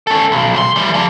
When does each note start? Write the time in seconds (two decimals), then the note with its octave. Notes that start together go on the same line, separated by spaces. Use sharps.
0.07 C#4 A4
0.32 B1
0.56 C#3 C6
0.76 E3 G3
0.94 F3 A#3